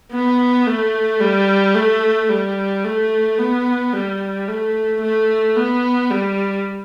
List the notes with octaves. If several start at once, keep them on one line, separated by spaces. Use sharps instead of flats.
B3
A3
G3
A3
G3
A3
B3
G3
A3
A3
B3
G3